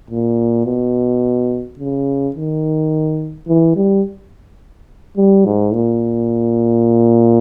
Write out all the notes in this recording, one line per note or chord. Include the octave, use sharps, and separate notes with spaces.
A#2
B2
C#3
D#3
E3
G3
G3
G#2
A#2